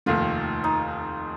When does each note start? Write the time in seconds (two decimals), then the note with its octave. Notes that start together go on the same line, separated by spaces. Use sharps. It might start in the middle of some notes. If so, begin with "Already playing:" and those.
0.06 F1 D#2 D#3 A3 F4
0.64 D#4